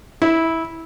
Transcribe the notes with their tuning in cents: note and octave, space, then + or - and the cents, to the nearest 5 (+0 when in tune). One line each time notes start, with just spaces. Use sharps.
E4 -15